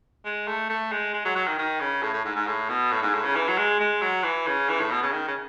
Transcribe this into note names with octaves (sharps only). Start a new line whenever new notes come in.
G#3
A3
A3
G#3
G#3
F#3
F#3
D#3
D#3
C#3
A2
A2
G#2
G#2
A2
B2
A2
G#2
A2
C#3
E3
F#3
G#3
G#3
F#3
E3
C#3
E3
A2
B2
C#3
D#3
C#3